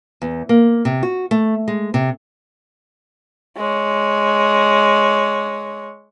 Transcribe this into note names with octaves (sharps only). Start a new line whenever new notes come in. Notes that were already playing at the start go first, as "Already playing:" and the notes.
E2
A#3
C3
F#4
A3
G#3
C3
G#3 C#5